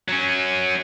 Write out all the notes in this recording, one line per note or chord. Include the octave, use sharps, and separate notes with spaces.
F#3 C#4